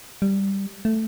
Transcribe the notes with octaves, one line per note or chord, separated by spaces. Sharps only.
G3
A3